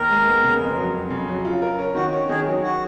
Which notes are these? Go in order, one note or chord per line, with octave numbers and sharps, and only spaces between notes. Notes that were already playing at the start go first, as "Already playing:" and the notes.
Already playing: D#2 A#4
G#3
B3
C#3
F2
F#3
F2
C#3
F#3
F4
A#4
C#4
D#3 F#4
C#4
D#3 G#4
F#3
F#4